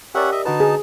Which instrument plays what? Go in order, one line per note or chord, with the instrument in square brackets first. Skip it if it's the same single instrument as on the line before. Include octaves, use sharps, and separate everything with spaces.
[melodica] C#4 E5 F#5 [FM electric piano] G4 A#4 D5
[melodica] D#5 E5
[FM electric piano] D3 F#4 B4 [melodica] D#4 A5
[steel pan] G#4